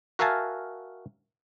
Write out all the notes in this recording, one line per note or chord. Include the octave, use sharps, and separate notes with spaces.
F#4 A#4 E5 F5 G#5 A5